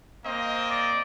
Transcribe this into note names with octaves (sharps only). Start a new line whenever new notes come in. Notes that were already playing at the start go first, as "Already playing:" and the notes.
A#3 C4 D#5
D5